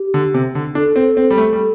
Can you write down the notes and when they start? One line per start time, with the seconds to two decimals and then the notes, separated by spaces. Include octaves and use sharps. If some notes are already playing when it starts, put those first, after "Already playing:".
Already playing: G4
0.14 D3
0.34 C3
0.55 D3
0.75 D4 A4
0.96 C4
1.17 C4
1.31 G3
1.38 A3
1.53 G3